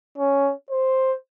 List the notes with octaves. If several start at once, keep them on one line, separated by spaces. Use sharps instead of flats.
C#4
C5